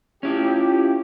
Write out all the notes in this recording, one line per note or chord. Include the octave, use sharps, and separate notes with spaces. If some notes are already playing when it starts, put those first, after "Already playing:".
C#4 E4 F4 G4